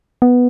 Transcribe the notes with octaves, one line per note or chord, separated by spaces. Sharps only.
B3